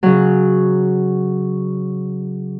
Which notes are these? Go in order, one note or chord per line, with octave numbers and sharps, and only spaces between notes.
C#3 F#3